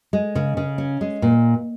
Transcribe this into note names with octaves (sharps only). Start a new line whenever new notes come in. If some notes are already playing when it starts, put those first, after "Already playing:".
G#3
C#3
C#3
C#4
G#3
A#2